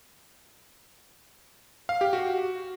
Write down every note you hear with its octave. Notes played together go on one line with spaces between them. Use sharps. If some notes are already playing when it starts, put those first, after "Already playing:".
F5
G4
F#4